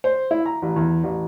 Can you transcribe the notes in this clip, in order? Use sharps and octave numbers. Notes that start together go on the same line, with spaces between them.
C5
E4
A#5
A1
E2
A1